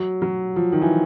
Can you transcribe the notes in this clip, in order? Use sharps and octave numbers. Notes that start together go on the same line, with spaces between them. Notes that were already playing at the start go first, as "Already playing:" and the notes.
Already playing: F#3
F#3
F3
D#3
E3